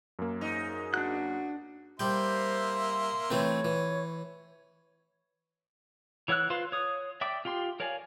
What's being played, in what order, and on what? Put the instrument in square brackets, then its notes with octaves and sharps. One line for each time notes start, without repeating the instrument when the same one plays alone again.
[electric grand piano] F#2 A#3
[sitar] G#2 D#4
[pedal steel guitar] D4 F#6 [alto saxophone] F#4
[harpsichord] G3 G5 [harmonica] A#3 E5 C6 [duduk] C5
[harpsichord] E3 A3 C4 [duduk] C#5
[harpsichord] E3
[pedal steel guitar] E3 C#5 F#5 E6 F#6
F4 B4 C5 F5 C6
C#5 D#6
D5 E5 G5 D6
F4 G4 G5 C6
A#4 C#5 D5 F5 G#5